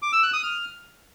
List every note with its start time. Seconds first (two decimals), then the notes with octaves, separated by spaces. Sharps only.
0.02 D6
0.13 E6
0.23 F#6
0.33 D#6
0.43 F6